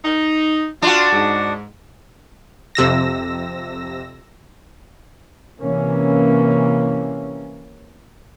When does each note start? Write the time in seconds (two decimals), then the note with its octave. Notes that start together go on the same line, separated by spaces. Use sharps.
0.05 D#4
0.82 D4 F4 F#4
1.12 G#2
2.75 F2 C3 E6 A#6
5.60 C3 E3 A#3 C#4